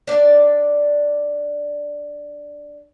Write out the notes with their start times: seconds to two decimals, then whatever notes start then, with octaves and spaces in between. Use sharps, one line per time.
0.07 D4 D5